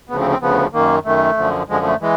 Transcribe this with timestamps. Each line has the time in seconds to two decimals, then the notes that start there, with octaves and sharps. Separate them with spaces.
0.09 D2 C#3 F3 B3
0.20 C4
0.31 C4
0.42 D2 C#3 F3 B3
0.73 F#2 D#3 A#3
1.05 F#2 D#3 A3
1.37 F#2 D3 F3
1.69 F#2 D3 F3 G#3
1.85 A3
2.01 E3 G#3